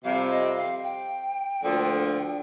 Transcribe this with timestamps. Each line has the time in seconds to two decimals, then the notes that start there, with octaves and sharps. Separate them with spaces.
0.04 F2 C3 G3 C4 F5
0.30 D#5
0.57 F5
0.84 G5
1.63 D2 D3 F3 A#3